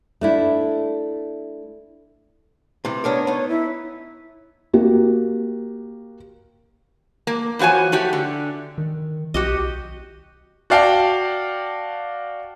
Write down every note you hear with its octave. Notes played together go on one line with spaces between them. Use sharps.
A3 D4 E4
C3 E3
B3 D4 A#4 C#5
B3 D#4 C#5
E4
A#3 F#4 G4
A#3
E3 F3 F#4 C#5 G#5
A3 F#4 G4
D3
D#3
B1 F#4 G4 D#5
F#4 D5 F5 G5 A5